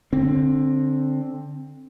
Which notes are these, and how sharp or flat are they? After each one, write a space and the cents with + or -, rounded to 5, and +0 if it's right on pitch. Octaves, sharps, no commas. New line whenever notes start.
D3 +0 C4 +15